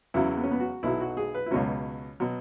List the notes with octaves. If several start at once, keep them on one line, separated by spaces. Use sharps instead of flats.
E2 C#3 F#3 E4
B3
C#4
B3
F#4
B1 B2 F#3 E4
F#4
G#4
B4
E4
C#2 B2 F#3 C#4
B2 F#3